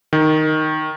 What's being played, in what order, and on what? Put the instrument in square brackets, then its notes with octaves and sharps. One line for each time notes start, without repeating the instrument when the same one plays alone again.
[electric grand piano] D#3